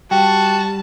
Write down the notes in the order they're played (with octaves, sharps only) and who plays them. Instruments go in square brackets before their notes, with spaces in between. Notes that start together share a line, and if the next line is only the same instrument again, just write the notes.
[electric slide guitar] G3 [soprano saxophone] F#4 [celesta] G5 [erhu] A5